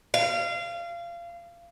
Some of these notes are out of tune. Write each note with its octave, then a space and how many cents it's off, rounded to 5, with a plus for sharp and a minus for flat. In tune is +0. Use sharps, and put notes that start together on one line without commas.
F5 -25